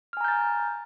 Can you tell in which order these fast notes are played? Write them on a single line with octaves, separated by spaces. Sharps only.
F6 G#5 A#5 G6 A6